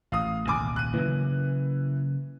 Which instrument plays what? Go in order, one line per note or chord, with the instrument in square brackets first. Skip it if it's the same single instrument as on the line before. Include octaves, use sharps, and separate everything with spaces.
[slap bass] A1 [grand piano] F5 D#6
[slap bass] D#1 C2 G#2 [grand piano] G#5 D6
[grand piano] F#6 D#7
[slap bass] C#3 F#3 A#3 [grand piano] E3